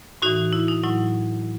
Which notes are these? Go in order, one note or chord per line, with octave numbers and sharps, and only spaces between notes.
A2 E3 D#4 F#4
E4
D#4
A2 F#3 E4